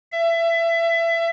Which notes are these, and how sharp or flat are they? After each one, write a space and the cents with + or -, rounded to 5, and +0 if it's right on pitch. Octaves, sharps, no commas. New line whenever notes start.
E5 +25